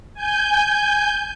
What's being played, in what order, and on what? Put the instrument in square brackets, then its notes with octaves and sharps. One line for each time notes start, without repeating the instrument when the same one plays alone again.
[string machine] G#5 G6